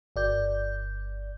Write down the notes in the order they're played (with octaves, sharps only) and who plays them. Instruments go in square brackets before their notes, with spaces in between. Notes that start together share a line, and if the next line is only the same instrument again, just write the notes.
[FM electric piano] G1 D5 G6